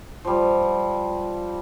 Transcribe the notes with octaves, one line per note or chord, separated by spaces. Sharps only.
F3 G3